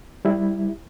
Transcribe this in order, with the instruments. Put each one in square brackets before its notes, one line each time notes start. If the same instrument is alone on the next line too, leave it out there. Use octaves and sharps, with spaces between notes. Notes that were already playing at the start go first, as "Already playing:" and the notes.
[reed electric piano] G3 E4